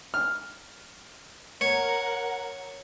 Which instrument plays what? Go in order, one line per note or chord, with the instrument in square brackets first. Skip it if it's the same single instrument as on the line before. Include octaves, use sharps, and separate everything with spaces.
[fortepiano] F6
[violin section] A#4 F#5 [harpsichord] C#5